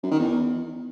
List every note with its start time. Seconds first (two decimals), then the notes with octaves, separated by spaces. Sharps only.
0.03 F#2
0.11 D#3
0.19 E2